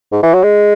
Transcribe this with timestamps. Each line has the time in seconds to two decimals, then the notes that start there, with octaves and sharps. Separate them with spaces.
0.12 G#2
0.23 E3
0.34 F#3
0.43 G#3